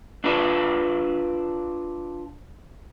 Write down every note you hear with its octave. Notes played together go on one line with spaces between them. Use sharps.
D4 F4 A4 B4 D5